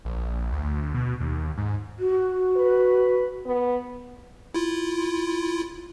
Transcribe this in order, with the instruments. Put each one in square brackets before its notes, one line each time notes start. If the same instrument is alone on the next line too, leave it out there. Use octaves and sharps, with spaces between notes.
[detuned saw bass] A#1
D2
B2
D#2
G#2
[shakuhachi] F#4
[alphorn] B4
B3
[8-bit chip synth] E4 F4